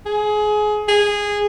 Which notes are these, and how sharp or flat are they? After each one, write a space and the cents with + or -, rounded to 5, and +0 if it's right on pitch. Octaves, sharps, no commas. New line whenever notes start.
G#4 +25
G#4 -15